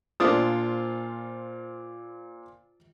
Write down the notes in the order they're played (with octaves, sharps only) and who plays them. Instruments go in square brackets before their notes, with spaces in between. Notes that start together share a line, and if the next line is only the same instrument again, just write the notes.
[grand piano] A#2 C5 [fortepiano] D4 F4 D#6